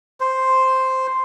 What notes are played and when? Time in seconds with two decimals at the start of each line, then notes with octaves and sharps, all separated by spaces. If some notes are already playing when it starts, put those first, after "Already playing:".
0.20 C5